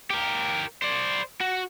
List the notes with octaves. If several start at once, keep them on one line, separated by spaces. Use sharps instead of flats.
G4 A#4
C5 D5
F#4